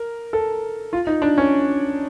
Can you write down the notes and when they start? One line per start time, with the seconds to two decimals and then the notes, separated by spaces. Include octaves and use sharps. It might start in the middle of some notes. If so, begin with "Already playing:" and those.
Already playing: A#4
0.33 A4
0.93 F4
1.07 D#4
1.22 D4
1.38 C#4